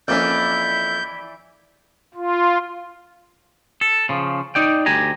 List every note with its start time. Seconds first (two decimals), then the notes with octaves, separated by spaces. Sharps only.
0.08 F2 E3 A#3 C#4 E4 D5 G6
2.15 F4
3.81 A4
4.09 C#3 F3
4.55 D#4 D5 G5
4.86 D2 G4 G#5 A#5